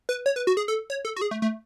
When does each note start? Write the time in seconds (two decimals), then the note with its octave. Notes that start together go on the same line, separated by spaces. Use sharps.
0.09 B4
0.26 C#5
0.36 B4
0.47 F#4
0.57 G#4
0.68 A4
0.90 C#5
1.05 A4
1.16 F#4
1.22 G#4
1.31 A3
1.42 A3